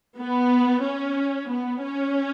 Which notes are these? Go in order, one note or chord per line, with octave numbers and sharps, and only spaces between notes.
B3
C#4
B3
C#4